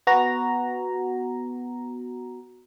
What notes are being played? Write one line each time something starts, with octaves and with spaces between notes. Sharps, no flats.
B3 F#4 A#5